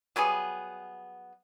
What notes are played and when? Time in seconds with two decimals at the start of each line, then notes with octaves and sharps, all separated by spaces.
0.16 F#3 G3 B3 G#4